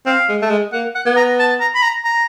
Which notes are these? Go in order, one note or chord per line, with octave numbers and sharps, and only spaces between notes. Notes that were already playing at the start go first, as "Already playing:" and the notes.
C4 F5
G#3
A3
G#3
A#3 F#5
F#5
B3
A#5
A5
A#5
B5
A#5
A#5